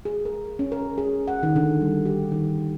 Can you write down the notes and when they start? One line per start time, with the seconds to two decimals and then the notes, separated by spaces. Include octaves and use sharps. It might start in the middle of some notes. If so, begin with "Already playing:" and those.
0.05 G#4
0.25 A#4
0.59 C#4
0.72 A#4
0.98 G#4
1.28 F#5
1.43 D#3
1.56 D3
1.81 G3
2.06 G4
2.32 D#3